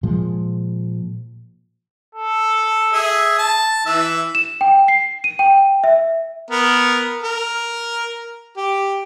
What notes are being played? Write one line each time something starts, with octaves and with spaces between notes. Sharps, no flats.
A#2 F3 G#3
A4
G#4 E5
A5
E3 E5 E6
E7
G5
C7
D#7
G5
E5
B3 A#4
A#4
G4